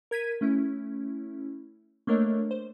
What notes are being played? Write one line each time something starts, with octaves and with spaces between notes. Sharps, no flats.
A#4 G#6 B6 D#7
A3 C#4 E4
A3 A#3 D4 A#4 C#5 D#5
C5